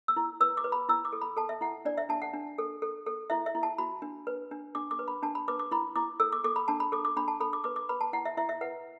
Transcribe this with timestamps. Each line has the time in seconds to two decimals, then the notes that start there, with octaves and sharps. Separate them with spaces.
0.08 E6
0.17 E4
0.40 B4 E6
0.57 D6
0.64 B4
0.72 B5
0.89 E4 E6
1.05 D6
1.12 A4
1.21 B5
1.37 A4 A5
1.49 E5
1.61 E4 F#5
1.85 D4 D5
1.98 E5
2.09 D4 A5
2.22 F#5
2.34 D4
2.58 A4
2.82 A4
3.06 A4
3.30 E4 E5
3.46 E5
3.55 E4
3.63 A5
3.78 F#4 B5
4.02 D4
4.27 B4
4.51 D4
4.75 D4 D6
4.91 D6
4.99 B4
5.08 B5
5.23 D4 A5
5.35 B5
5.48 B4 D6
5.59 D6
5.72 E4 B5
5.96 E4 D6
6.20 A4 E6
6.32 D6
6.44 A4 D6
6.56 B5
6.68 D4 A5
6.80 B5
6.92 A4 D6
7.05 D6
7.16 D4 B5
7.28 A5
7.40 A4 B5
7.53 D6
7.64 B4 D6
7.76 D6
7.89 B4 B5
8.01 A5
8.13 E4 F#5
8.25 E5
8.37 E4 E5
8.49 E5
8.61 B4 F#5